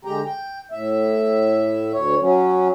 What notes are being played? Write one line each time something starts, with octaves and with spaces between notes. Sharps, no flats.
D3 G#3 G4 G5 A#5
G5
A2 E5
D2 C#5
F#3 C#4